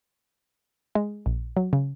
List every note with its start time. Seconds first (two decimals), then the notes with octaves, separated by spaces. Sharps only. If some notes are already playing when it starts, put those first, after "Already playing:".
0.95 G#3
1.26 A#1
1.57 F#3
1.73 C#3